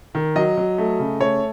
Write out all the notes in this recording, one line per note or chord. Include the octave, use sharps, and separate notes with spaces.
D#3
F#3 D#5
F#3
A3
C#3
A3 C#5